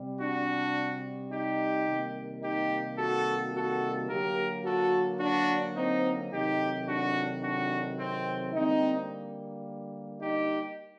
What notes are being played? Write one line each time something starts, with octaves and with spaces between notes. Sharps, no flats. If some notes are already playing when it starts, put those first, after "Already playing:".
Already playing: C3 G3
D4 F#4
D#4 G4
C3 D#3 G3 A#3
D#4 G4
F#4 A4
F#4 A4
D3 F#3 A#3 G4 A#4
F#4 A4
D4 F#4
C4 D#4
C3 D#3 F#3 A3 D#4 G4
D4 F#4
D4 F#4
C4
D3 G3 A#3 C4 D#4
D#4 G4